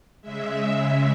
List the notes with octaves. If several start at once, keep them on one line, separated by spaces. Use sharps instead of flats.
C#3 G#3 E5